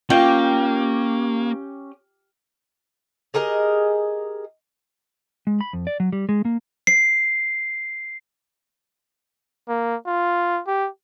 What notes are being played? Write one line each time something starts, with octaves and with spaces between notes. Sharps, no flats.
A#3 C#4 F4 G4 G5
G4 G#4 A#4 D#5
G#3
B5
F2
D5
F#3
G3
G#3
A#3
C7
A#3
F4
G4